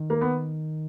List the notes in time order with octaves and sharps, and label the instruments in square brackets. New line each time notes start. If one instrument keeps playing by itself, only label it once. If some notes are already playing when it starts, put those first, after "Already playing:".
Already playing: [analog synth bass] D#3
[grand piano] A#3
B3